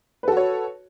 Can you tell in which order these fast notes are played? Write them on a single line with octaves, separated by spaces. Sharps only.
B4 A4 F#4 C#5